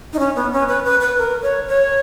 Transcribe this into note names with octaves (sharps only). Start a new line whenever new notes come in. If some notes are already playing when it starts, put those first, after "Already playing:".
D#4
C#4
B3
C#4
B4
B4
B4
A#4
C#5
C#5